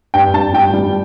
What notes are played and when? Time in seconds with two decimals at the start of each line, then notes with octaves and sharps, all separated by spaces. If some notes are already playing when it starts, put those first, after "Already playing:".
0.14 G2 G5
0.34 G2 A5
0.53 G3 G5
0.74 G3